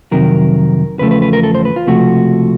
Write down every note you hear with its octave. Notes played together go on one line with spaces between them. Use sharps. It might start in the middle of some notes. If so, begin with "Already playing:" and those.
F2 C3 D#3 F#3 A#4
E2 C#3 F3 A3 B4
B4
B4
A#4
A4
C5
B4
F4
C#2 C3 F3 A3 F#4